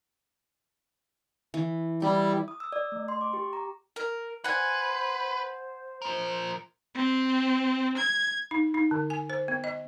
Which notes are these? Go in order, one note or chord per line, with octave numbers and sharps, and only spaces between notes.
E3
G3 E4
D#6
E6
D5
A3
C6
D6
G4
A#5
A#4
B4 C5 F#5 G#5
F3 A#4 C5
C4
G#6
D#4
D#4
D3
G#5
C5
B3
D#5